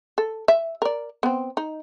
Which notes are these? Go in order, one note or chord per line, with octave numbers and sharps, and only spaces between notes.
A4
E5
A#4 D5
B3 C4
D#4